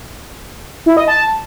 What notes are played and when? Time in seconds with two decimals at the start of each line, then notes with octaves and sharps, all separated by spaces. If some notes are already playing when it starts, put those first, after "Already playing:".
0.86 E4
0.97 D#5
1.08 A5